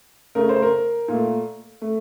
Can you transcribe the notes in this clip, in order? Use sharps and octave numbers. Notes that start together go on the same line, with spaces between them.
C#3 A3 A#4
C5
A#4
A#2 A3
A3